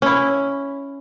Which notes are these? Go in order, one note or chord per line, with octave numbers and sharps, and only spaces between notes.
C#4 E4